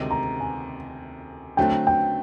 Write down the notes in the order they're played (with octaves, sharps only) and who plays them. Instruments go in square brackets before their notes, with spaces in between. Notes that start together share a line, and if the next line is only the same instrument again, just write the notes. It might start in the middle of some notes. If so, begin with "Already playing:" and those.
Already playing: [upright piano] D2 C3 D#3 G#3
[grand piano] A#5
G#5
[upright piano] D3 F#3 A3 C4 [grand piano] G5
[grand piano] G5